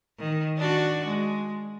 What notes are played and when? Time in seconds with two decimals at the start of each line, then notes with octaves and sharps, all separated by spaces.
0.19 D#3
0.58 D4 F#4
1.06 G#3